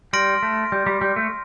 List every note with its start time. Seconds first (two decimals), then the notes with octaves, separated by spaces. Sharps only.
0.13 G3 C6 F6 A#6 D7
0.43 A3
0.72 G3
0.86 G3
1.01 G3
1.16 A3